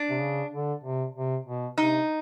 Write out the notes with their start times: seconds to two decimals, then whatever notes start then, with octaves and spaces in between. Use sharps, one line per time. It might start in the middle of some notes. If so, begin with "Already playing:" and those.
Already playing: D4
0.10 C3
0.20 C#3
0.52 D3
0.84 C3
1.15 C3
1.46 B2
1.77 C3 D#4